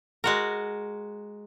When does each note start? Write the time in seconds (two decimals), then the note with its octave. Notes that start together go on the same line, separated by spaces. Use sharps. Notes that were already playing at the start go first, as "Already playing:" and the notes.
0.24 G#3 F#4 A#4